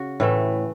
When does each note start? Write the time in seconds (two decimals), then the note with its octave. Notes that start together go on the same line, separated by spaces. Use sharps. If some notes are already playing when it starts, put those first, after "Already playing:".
Already playing: C#3 F#4
0.20 A2 E3 A3